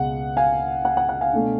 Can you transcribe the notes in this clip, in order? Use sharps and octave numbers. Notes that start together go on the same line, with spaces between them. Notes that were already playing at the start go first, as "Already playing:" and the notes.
Already playing: C#2 B2 G#3 F#5
F5 G#5
F#5
F#5
F#5
F5 G#5
B2 A3 D4